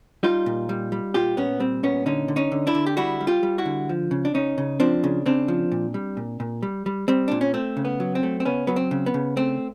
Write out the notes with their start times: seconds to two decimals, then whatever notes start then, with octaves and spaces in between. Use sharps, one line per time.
0.23 G3 D#4 F4
0.46 A#2
0.69 G3
0.92 G3
1.14 A#2 F4 G4
1.37 A#2 B3 C#4
1.60 G3 C4
1.83 A#2 B3 C#4
2.06 D3 C#4 D#4
2.28 D3
2.36 C#4 D#4
2.52 D3
2.67 D4 E4
2.75 D3
2.86 G4
2.97 G3 E4 F#4
3.21 G3
3.27 F4 G4
3.43 G3
3.58 E4 F#4
3.65 D3
3.89 F3
4.11 C#3
4.25 D4
4.34 C#3 C#4 D#4
4.58 C#3
4.80 F3 C4 D4
5.04 C#3
5.26 C#3 C4 D4
5.48 F3
5.72 A#2
5.94 G3
6.17 A#2
6.40 A#2
6.63 G3
6.86 G3
7.08 G3 C4
7.28 A#2 D4
7.41 C#4
7.54 A3 C4
7.77 C#3
7.85 B3
8.00 F#3
8.15 C4
8.23 A3
8.40 C4
8.45 C#3 B3 C#4
8.67 F#3 B3
8.76 C4
8.91 C#3
9.06 B3
9.14 C#3
9.37 A3 C4